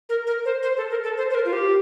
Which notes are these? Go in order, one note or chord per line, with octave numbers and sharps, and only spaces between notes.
A#4
A#4
C5
C5
A4
A#4
A4
C5
C5
A#4
F4
G4